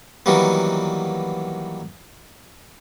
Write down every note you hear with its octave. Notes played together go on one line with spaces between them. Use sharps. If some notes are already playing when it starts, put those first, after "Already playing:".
D#3 E3 F#3 G3 A#3 B3